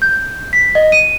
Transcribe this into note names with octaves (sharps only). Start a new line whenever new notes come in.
G6
B6
D#5
D#7